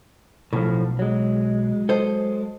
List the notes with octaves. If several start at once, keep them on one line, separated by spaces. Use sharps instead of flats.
B1 A2 F3
F#3 G#3
A4 C5 D#5